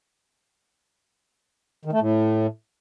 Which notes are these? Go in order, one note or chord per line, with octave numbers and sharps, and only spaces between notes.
D#3
A3
A2